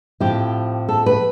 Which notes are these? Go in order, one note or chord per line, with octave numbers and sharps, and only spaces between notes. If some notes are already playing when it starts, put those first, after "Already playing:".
A2 F3 C4 E4 G4
A4
B4